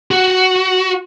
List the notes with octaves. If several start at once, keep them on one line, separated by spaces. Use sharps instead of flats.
F#4